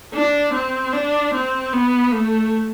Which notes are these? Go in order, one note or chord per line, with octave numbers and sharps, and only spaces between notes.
D4
C4
D4
C4
B3
A3